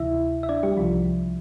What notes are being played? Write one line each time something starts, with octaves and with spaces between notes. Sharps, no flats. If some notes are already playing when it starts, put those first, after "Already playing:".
Already playing: D2 C3 E3 E4 E5
E5
D4 D5
G3 G4
C2 C3 E3 F3 F4